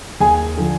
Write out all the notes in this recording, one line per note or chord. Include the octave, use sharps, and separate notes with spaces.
D#2 G#4 G#5
D3 F3